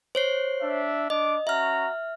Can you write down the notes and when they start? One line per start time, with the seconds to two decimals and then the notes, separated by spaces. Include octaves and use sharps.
0.15 C5 C#5 C7
0.61 D4 E5
1.10 D4 D#5 D6
1.47 C#4 F#4 E5 A#5 F6